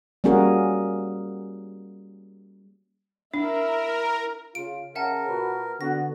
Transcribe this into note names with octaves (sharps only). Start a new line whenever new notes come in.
G3 A#3 C#4 F#4 G#4 A#4
D4 E4 A#4 E5
C#3 F4 D7
C#3 A#4 E5 F#5 A5
A#2 F#4 B4
D3 B3 F#4 A#6